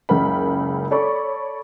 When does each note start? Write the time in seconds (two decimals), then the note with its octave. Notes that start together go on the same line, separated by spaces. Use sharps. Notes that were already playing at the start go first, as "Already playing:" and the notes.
0.09 F#1 C#2 A#4 B5
0.91 A4 C#5 D5 B5 C#6